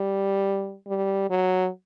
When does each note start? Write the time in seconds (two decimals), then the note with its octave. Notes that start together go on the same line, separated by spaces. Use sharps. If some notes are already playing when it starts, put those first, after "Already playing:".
Already playing: G3
0.88 G3
1.31 F#3